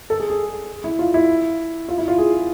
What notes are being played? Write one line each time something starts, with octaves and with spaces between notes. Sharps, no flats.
A4
G#4
G#4
E4
F4
E4
F4
E4
F4
G#4